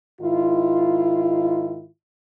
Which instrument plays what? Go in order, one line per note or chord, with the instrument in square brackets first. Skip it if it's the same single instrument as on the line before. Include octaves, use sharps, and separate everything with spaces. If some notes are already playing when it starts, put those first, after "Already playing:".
[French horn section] G#2 D#3 E4 F4